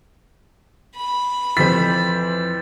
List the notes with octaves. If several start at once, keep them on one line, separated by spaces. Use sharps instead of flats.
B5
F2 E3 C5 A6 B6